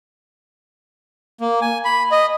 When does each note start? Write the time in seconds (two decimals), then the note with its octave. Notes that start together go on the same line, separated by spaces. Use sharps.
1.41 A#3
1.61 G#5
1.85 B5
2.11 D#5